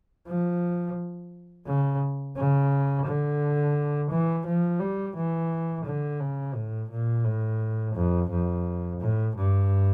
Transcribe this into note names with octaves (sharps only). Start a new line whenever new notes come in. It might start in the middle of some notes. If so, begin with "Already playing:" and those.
F3
C#3
C#3
D3
E3
F3
G3
E3
D3
C#3
A2
A#2
A2
F2
F2
A2
G2